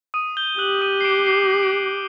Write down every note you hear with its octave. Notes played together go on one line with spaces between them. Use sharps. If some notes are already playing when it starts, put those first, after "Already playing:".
D#6 D#7
G6 G7
G4 F#6 F#7
D#6 D#7
C7
D6 D7
C7
C7
D7
C7